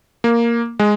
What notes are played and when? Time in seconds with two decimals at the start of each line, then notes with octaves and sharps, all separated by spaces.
0.24 A#3
0.79 G#3